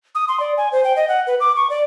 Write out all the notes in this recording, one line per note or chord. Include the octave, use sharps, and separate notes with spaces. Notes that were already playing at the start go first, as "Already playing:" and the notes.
D#6
C6
D5
G#5
C5
G5
D#5
F#5
B4
D6
C#6
D5